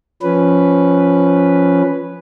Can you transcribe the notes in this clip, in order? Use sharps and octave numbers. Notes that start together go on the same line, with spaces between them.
F3 C#4 B4